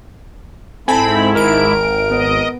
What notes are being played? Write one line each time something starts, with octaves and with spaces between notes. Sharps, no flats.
G#2 C4 E4 A4 G#5 A5 B5
G#1 A#4 D7
B3 D#5